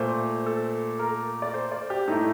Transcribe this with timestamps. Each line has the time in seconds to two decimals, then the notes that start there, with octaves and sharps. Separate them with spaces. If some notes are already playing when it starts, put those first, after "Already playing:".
Already playing: A#2 A3 C5
0.46 A4
0.99 A#4
1.42 D5
1.54 C5
1.72 D5
1.90 G4
2.07 A2 A3 D#4